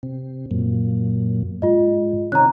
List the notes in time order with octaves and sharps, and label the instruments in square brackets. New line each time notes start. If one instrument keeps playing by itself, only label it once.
[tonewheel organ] C3
F#2 A#2
[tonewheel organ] G#2 [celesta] F4 D#5
[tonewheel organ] C3 D#3 C#4 [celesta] A#5 F#6